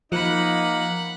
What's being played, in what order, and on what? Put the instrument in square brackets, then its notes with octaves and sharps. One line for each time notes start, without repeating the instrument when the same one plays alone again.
[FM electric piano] F3 [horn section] A#3 D#4 [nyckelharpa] F#5 B5